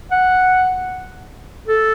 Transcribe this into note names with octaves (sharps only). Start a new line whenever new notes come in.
F#5
A4